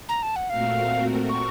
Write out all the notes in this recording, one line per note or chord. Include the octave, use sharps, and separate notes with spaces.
A#5
A5
F#5
A#2 A3 C4 F#4 A#4 F5
C#6